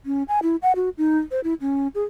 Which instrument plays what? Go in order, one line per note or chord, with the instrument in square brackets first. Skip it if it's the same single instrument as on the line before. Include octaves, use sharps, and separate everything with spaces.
[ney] C#4
G#5
E4
F#5
F#4
D#4
C5
E4
C#4
G#4